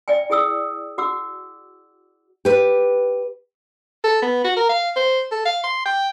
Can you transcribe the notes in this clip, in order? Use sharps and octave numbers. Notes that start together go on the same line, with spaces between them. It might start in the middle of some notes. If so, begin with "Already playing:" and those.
D5 E5 G5 G#5
E4 G#4 G5 D#6 E6
F#4 F#5 D6 E6
G4 B4
A4
B3
F#4
A#4
F5
C5
A4
F5
C6
G5